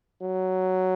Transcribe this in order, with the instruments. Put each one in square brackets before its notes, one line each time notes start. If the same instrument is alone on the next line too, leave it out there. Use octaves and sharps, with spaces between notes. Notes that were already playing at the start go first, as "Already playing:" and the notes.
[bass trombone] F#3